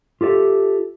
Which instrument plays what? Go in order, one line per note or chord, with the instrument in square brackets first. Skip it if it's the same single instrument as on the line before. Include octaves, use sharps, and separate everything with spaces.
[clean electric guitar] F4 G4 A4 D5 E5